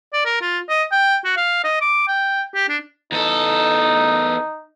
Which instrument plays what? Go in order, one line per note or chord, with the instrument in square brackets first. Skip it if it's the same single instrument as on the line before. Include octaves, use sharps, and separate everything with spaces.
[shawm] D5
A#4
F4
D#5
G5
F#4
F5
D#5
D6
G5
G4
D4
[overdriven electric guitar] E2 A4 [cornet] D#4